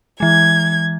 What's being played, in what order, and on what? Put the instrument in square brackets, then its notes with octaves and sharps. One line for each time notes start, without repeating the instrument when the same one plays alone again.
[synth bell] E3 G#3 [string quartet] G#6